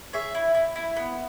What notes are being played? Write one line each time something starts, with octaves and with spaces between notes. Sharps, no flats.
G#4 C#5 E5
E4
E4
E4
B3